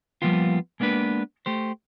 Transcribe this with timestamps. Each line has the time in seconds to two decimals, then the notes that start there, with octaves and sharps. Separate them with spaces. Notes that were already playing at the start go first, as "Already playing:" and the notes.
0.22 F3 G3 A#3 B3 F4
0.80 G#3 A#3 B3 D4 B4
1.46 A3 G4 C5